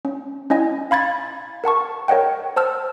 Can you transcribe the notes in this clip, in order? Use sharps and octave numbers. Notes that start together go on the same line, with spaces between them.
C#4
C#4 E4 D#5 G#5
F5 B5 G#6 A6
A#4 F#5 A5 C#6
A#4 C#5 D#5 F#5 G5
C5 A5 E6 F6